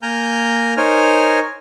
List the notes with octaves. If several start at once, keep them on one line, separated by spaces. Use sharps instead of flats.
A#3 A#4 G#5 A#5 F6 G6
D#4 A#4 C5 C#5 G#5 F6